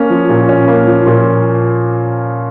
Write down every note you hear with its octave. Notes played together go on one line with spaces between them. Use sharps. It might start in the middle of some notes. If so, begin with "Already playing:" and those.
Already playing: A#3 C#4
F3
A#2
C#4
A#3
F3
A#2